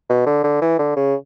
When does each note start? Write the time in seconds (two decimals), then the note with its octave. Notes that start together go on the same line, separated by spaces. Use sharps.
0.09 B2
0.26 D3
0.44 D3
0.62 E3
0.79 D3
0.96 C#3